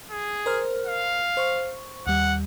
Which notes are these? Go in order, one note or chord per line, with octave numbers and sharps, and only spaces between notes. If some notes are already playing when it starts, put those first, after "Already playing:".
G#4
A#4 C5 F6
F5
C5 C#6
D#2 G3 F#5